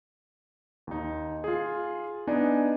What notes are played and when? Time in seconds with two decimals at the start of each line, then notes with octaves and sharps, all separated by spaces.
0.87 D#2 D#4
1.44 F4 G#4
2.27 B3 D4 D#4 G#5